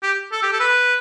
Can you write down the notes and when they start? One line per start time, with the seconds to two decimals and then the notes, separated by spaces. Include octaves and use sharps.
0.02 G4
0.32 A4
0.42 G4
0.52 A4
0.60 B4